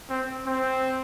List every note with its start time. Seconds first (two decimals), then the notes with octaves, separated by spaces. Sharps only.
0.10 C4
0.46 C4